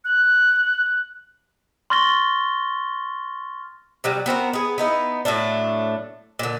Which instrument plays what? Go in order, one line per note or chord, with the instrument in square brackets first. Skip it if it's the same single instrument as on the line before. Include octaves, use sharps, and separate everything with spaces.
[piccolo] F#6
[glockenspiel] C6 C#6 F6 A6 A#6 G7
[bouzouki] C3 F#3 G3
B3 C4 F#4 A#4
B3 G#4
B3 D#4 E4
A2 F#3 A3 D4
A#2 D3